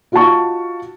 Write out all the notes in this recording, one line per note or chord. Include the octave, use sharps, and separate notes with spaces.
D#4 F4 F#4 F#5 A5 C#6